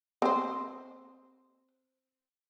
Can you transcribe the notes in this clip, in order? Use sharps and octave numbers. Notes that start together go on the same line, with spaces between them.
C4 C5